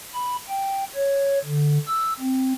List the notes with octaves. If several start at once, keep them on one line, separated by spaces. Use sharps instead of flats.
B5
G5
C#5
D3
E6
C4